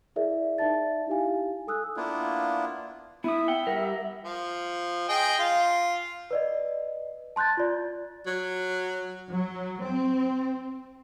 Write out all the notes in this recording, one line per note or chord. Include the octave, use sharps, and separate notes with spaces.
E4 G#4 A#4 D5 E5
D#4 D5 E5 A5 A6
D#4 E4 G4 F5 G#5
A4 G#5 D#6 E6 F#6
A#3 B3 D4 E4 F4
B3 E4 E5 D#6
F#5 G5
G3 G4 A#4 F#5
F3
G#4 D#5 G5
F4
B4 D5 D#5
A5 C6 F#6 G6 A6
F4 D5
F#3
F#3
C4